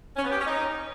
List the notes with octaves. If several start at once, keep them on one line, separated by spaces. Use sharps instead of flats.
C#4
B3
G4
C#4
D#4